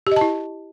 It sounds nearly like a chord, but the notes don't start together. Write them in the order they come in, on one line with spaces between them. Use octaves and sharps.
G4 D#5 A5 E4